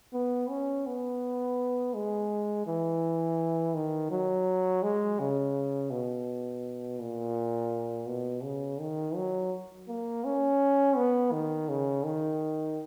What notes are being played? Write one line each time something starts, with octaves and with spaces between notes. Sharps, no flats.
B3
C#4
B3
G#3
E3
D#3
F#3
G#3
C#3
B2
A#2
B2
C#3
D#3
F#3
A#3
C#4
B3
D#3
C#3
D#3